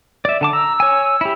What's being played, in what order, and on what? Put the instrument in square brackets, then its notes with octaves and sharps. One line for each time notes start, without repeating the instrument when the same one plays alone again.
[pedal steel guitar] D5 E5
D3 A5 D6
[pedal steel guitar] A#5 [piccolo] E6
[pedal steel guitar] C#5 G#5
E4 G4